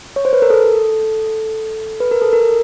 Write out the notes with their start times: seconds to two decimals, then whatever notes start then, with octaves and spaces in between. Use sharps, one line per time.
0.16 C#5
0.25 C5
0.33 B4
0.42 A#4
0.50 A4
2.00 B4
2.11 A#4
2.22 A4
2.33 A#4